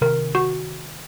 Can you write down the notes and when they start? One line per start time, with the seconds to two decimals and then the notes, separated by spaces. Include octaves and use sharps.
0.01 C3 D#3 A#4
0.35 F#4